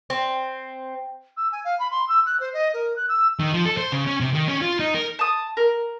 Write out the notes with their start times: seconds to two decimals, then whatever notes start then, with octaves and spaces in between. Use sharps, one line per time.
0.10 C4
1.37 E6
1.52 G#5
1.64 F5
1.79 B5
1.91 C6
2.08 E6
2.26 F#6
2.40 C5
2.53 D#5
2.73 A#4
2.96 F#6
3.09 E6
3.40 D#3
3.53 F3
3.65 A4
3.77 C5
3.92 C#3
4.07 C#4
4.20 C3
4.34 D#3
4.48 C#4
4.62 F4
4.80 D#4
4.94 A#4
5.19 A5 D#6
5.57 A#4